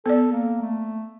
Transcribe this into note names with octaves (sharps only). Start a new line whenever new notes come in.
B3 A4 D5
A#3
A3